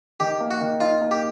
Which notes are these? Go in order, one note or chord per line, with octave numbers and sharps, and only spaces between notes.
D#3 G4
A#3
F#4
D#3
D#4 F4
A#3
G4